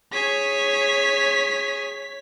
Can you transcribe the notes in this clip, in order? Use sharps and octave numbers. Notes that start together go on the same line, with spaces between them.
G#4 C#5 B6